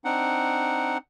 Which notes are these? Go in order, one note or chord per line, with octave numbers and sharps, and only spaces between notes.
C4 D4 D#4 F#5